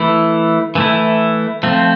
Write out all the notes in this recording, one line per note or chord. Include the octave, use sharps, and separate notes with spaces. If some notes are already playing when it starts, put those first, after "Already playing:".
Already playing: E3 A3 E4
E3 A3 E4
F3 A3 C4